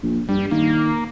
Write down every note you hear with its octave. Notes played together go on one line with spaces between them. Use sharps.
A#1
G2 G3
D#3 A#3